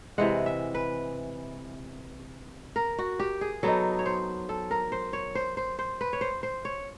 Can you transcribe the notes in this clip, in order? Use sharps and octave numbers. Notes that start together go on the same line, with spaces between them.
C3 E3 G#3 F#5
E5
B4
A#4
F#4
G4
G#4
F#3 B3 D#4 A4
C#5
C5
A4
A#4
C5
C#5
C5
C5
C5
B4
C#5
C5
C5
C#5